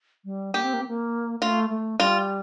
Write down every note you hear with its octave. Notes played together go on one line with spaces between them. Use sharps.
G3
A#3 G4
C4
A#3
C4
A#3
A3 F4
A3
G3 F4